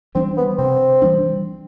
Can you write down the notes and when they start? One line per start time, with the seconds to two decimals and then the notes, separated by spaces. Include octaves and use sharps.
0.15 E3 G3 C4 D4
0.37 B3
0.58 C3 C4
1.02 E3 G3 D4